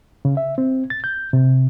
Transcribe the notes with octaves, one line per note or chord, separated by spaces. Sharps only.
C#3
E5
C4
A6
G6
C3